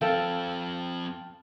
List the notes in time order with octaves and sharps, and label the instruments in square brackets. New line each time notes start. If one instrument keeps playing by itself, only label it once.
[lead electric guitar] F3 C4 [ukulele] A4 [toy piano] F5 [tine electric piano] G5 A5 F6